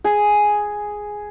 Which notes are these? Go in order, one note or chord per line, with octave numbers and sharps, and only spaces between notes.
G#4